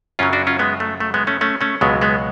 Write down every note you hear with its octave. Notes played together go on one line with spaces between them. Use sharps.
F#2 C#3 F#3 C#4 F4
D4 F#4
C#4 F4
G#3 B3
A3
A3
G#3 B3
A3 C#4
A3 C#4
A3 C#4
C#2 B2 F#3 G#3 B3
G#3 B3